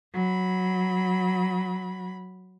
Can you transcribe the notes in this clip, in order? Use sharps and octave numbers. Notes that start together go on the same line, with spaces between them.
F#3 B5